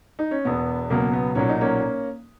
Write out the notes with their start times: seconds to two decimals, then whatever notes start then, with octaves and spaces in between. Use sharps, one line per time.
0.19 D#4
0.31 C#4
0.45 E1 E2 B2 B3
0.90 C#2 B2 F#3 A#3
1.13 B3
1.35 B1 A#2 F#3 C#4
1.49 D#4
1.61 A#3 C#4